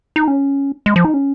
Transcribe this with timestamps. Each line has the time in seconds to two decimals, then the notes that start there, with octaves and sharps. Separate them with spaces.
0.16 D#4
0.28 C#4
0.86 G#3
0.96 F3
1.05 D#4
1.14 C#4